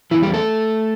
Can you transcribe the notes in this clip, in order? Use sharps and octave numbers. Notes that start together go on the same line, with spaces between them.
E2 C#3 E3 E4
G3 G4
A3 A4